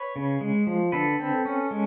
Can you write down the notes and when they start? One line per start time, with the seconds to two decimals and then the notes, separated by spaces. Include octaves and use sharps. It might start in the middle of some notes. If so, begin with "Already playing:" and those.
Already playing: B4 C#5
0.16 C#3
0.41 G#3
0.67 F3
0.92 D3 A4 B4
1.19 C4
1.45 C#4
1.71 G#3